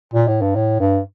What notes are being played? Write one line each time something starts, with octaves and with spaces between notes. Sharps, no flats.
A#2
A2
G2
A2
G2